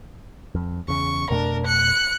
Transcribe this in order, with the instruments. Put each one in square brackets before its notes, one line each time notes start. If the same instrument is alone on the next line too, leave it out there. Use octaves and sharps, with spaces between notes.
[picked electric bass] F2
[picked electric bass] E2 C#3 [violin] C#6
[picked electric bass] F2 B2 A3 [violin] D4 A#4
[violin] F#6 C#7